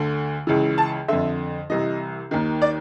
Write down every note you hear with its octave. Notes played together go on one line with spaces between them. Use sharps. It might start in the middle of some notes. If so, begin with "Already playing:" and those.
Already playing: D2 D3
C#2 C#3 E3
A5
F2 D3 E5
C2 C3 E3 D#5
D#2 D#3
D5